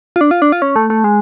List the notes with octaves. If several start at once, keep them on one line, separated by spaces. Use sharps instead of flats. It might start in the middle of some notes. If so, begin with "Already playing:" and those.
F4
D4
F4
D4
F4
C#4
A3
A3
G#3